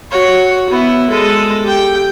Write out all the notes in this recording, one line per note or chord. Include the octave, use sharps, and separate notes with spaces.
F#4 C#5
B3 E4
G#3 A4
G4 G5